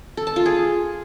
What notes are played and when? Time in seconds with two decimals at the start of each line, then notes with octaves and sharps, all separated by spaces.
0.17 A4
0.27 A5
0.36 F4
0.46 G#4